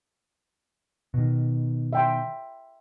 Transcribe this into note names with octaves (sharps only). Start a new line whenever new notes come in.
B2 D#3
E5 G5 C6